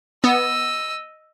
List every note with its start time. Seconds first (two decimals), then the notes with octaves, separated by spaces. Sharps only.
0.24 B3 D#5 E6